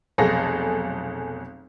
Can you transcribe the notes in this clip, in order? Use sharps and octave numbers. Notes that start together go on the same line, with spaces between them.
F1 B1 G#4 A4 A#6